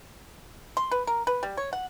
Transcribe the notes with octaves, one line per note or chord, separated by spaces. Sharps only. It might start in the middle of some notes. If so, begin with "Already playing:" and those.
C6
B4
A#4
B4
G3
C#5
F#5